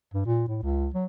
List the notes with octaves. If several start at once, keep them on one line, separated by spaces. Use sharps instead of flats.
G2
A#2
A2
C#2
F#3